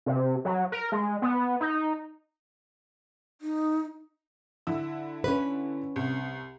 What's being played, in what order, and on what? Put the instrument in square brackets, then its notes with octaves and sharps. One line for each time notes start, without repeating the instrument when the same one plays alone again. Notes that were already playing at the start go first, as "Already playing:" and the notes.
[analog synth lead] C3
F#3
A#4
G#3
B3
D#4
[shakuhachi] D#4
[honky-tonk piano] D3 E4 E6
[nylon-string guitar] C#4 B4
[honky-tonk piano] C2